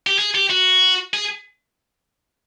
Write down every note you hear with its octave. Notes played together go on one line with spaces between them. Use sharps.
G4
G#4
G4
F#4
G#4